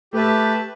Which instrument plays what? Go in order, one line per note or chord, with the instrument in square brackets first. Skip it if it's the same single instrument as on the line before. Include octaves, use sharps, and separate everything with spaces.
[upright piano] A3 [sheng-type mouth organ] G4 B4 E5 A5